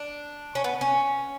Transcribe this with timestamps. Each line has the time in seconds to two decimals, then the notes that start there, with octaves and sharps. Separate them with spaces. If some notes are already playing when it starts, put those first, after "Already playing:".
Already playing: D4
0.55 C#4
0.64 B3
0.81 C#4